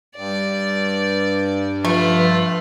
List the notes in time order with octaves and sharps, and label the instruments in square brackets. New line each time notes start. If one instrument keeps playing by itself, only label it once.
[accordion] G2 [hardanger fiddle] D5
[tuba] F3 [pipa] A3 [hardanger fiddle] F4 B4